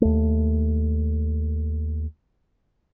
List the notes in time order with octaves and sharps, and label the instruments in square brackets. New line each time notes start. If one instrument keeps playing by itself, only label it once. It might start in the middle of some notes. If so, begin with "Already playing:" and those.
[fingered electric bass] D#2 A3